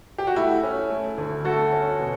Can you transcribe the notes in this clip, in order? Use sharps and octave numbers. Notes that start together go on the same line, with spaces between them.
G4
F#4
A3 E4
C#4
A3
D2
A3 F#4 A4
C#4
B2